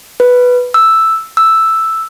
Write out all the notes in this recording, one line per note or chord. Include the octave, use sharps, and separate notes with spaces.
B4
E6
E6